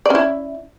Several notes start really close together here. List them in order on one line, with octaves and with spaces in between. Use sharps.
D5 C#4 E4